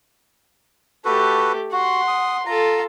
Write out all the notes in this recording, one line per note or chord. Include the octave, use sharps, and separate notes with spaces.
A3 F#4 G4 A4 B4
F#4 F#5 C6
D#6
F4 A4 A#5